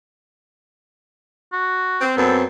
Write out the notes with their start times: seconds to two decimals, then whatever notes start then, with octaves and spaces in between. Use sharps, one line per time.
1.53 F#4
2.01 C4
2.17 F#2 B3 C4 A4